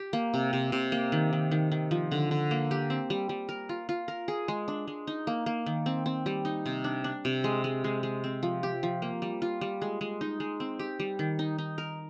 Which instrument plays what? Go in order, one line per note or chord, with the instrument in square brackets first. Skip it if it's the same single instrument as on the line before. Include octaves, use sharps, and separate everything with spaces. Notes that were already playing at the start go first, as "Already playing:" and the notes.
Already playing: [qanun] G4
A#3
C3
C3
C3
A#3
D#3
D#3
D#3
D#3
F3
D3
D3
A#3
G4
C4
G3
G3
A#4
F4
F4
A#4
G#4
G#3
D4
G#3
D#4
A#3
A#3
D#3
C4
C4
G3
D#4
C3
D4
D4
C3
G#3
G#3
G#3
G#3
C4
F3
G4
F3
A#3
G3
F4
G3
G#3
G#3
D#4
G#3
C4
G4
G3
D#3
D#4
D#4
A#4